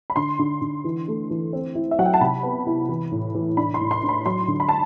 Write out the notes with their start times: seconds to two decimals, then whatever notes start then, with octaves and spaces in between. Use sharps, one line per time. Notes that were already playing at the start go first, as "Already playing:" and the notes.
0.10 B5
0.16 D3 C6
0.39 D3
0.61 D3
0.84 E3
1.08 A3
1.31 E3
1.53 C4
1.75 E4
1.91 E5
1.98 F#3 F#5
2.06 G5
2.14 A5
2.21 C3 B5
2.43 B3
2.67 E4
2.89 E3
3.11 A2
3.35 E3
3.57 D4 B5
3.74 C6
3.81 A2
3.91 C6
4.03 D4
4.09 B5
4.26 F#3 C6
4.48 D3
4.60 B5
4.69 A5